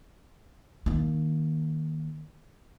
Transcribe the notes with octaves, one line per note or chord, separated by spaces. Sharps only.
D#3 A#3